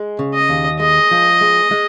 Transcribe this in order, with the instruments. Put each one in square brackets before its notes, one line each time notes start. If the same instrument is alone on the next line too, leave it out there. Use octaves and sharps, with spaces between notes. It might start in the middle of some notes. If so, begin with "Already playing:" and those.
Already playing: [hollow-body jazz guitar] G#3
C#3
[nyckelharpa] D#5
[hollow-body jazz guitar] D#2
[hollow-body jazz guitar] G#3 [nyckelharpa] D#5
[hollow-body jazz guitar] F3
G#3
G#3